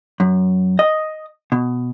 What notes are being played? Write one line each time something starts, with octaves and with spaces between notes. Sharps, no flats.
F#2
D#5
B2